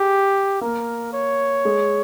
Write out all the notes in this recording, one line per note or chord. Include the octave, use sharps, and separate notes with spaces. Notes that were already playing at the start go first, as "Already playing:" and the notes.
Already playing: G4 G#4
A#3 A#4
C#5
G#3